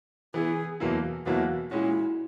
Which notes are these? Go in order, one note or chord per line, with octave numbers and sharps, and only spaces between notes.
E3 B3 E4 G#4
E2 B2 F#3 A#3 E4
E2 B2 F#3 A#3 E4 F#4
A#2 G#3 C#4 E4 F#4